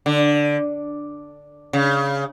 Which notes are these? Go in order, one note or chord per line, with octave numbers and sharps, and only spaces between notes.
D3
C#3